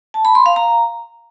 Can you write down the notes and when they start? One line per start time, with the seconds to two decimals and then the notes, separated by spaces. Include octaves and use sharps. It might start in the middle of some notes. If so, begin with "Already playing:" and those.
0.14 A5
0.25 B5
0.35 C6
0.46 F5
0.56 A#5